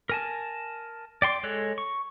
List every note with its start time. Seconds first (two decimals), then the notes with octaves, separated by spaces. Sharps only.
0.09 A#4 G#5 A5
1.22 D5 G5 C6 D6
1.43 G#3 A4 C#5 F#6
1.78 C#6